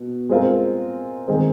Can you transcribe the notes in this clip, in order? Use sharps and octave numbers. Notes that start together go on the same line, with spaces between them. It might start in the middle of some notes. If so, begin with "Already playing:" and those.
Already playing: B2
G#3 C4 F4 A#4
D#3 G#3 C4